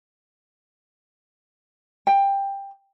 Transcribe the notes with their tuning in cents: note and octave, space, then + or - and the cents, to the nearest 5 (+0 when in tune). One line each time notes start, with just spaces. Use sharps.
G5 +15